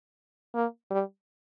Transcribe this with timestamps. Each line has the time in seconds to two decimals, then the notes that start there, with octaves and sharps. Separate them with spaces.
0.55 A#3
0.91 G3